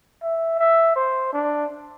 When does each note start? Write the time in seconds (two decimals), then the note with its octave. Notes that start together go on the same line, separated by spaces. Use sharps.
0.22 E5
0.59 E5
0.96 C5
1.33 D4